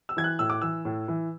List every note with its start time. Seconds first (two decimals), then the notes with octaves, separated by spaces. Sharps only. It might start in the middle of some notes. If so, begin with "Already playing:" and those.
0.09 E6
0.17 E3 G#6
0.24 F#6
0.39 A2 E6
0.50 D6
0.62 E3 E6
0.85 A2
1.08 E3